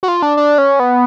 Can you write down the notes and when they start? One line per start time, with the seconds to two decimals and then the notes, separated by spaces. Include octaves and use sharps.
0.03 F#4
0.08 F4
0.22 D4
0.37 D4
0.58 C#4
0.80 B3